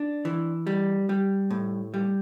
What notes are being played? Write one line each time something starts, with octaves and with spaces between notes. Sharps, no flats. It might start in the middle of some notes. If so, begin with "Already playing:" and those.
Already playing: D4
E3
G3
G3
A2
G3